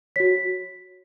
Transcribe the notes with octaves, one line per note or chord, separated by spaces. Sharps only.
F#4 C#5 B6